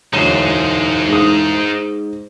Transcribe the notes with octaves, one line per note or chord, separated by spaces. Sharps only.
E1 D2 F#3 D#4 C5 E7
G#2 D#6